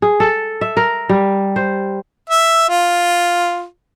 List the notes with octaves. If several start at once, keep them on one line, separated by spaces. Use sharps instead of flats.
G#4
A4
E5
A#4
G3
C5
E5
F4